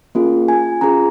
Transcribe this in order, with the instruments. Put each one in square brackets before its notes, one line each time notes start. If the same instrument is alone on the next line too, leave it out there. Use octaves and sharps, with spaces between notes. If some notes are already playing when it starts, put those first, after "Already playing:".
[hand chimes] A#3 C#4 F4 G#4
G#5
C#4 F4 G#4 A#5